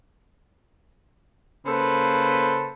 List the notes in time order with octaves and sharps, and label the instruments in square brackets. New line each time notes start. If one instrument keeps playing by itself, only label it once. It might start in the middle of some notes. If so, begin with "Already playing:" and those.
[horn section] C#3 A#3 A4 B4 C5